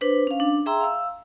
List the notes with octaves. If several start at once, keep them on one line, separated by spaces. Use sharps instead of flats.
D4 B4 C5
C#4 F5
D4
G#4 E5 G5 A#5 C6 E6
F5 E6